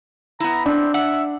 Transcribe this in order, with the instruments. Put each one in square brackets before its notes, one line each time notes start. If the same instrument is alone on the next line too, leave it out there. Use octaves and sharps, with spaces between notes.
[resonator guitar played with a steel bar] B3 E4 [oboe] A#5
[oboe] C4 [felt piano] D4
[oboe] E5 [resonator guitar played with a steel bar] F#5